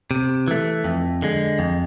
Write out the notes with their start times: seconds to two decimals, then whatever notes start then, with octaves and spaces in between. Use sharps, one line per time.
0.11 C3
0.48 E3 A3
0.84 F2
1.22 D3 G#3
1.59 F2